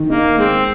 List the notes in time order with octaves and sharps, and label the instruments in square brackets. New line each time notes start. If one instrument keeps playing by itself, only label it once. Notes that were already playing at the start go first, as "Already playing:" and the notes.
Already playing: [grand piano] D#3
[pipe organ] A#3 [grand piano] D#4
[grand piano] G#3 [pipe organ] C4